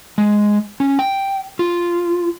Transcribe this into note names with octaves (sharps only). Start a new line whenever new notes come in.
G#3
C#4
G5
F4